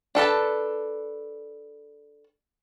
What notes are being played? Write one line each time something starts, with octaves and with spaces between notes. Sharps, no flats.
D4 A4 B4 A5